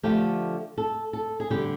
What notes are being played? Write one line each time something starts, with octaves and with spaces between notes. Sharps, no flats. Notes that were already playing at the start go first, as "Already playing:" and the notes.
D3 F3 A3 G4
A4
A4
G#4
D3 G3 G4